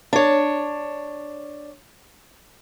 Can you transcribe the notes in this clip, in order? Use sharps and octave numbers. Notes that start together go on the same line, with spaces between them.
D4 C#5